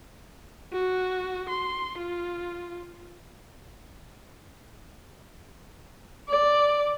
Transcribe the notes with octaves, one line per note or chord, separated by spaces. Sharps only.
F#4
C6
F4
D5